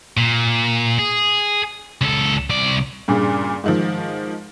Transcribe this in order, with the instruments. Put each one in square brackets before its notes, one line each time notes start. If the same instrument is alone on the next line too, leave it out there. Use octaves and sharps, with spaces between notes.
[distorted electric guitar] A#2
G#4
C#2 A4
C2 D5
[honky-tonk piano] G2 A#2 C#3
G#2 D#3 F3